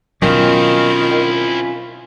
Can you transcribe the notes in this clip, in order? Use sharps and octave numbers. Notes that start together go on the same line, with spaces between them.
B2 D#3 F#3 C4 C#4 E4 F4